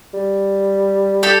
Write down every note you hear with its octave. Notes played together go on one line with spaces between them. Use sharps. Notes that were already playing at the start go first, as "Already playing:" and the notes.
G3
G4 A4